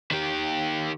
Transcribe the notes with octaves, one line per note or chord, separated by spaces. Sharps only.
D#3 G4